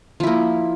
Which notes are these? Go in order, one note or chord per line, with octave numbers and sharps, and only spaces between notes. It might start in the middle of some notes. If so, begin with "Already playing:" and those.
F3 A#3 E4